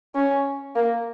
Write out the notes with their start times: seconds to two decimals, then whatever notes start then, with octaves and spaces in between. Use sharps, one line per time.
0.15 C#4
0.76 A#3